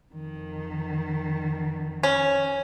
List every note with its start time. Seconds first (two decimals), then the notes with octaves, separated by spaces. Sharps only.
0.13 F2 D#3
2.03 C#4